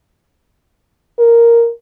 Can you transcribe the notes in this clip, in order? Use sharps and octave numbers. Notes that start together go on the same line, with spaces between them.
A#4